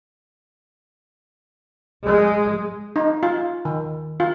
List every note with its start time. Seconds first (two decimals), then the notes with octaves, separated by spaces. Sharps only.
2.04 G#3
2.96 D#4
3.23 F4
3.65 D#3
4.20 F4